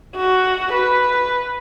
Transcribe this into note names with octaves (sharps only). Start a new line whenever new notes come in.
F#4
B4